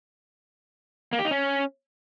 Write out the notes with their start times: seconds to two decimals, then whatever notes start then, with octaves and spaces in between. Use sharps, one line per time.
1.13 A#3
1.19 G4
1.25 D#4
1.31 C#4